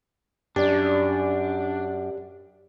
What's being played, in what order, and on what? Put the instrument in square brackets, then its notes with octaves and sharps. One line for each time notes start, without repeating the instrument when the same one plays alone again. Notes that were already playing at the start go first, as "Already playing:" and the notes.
[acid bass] F#2 [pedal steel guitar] D4 [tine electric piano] G4 D5